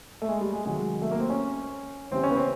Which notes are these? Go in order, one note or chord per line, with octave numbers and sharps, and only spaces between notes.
A3
G#3
G3
G#3
C3 D#3 F#3 G#3
A3
A#3
C4
C#4
C#3 E3 G3 C4
C#4
B3
C4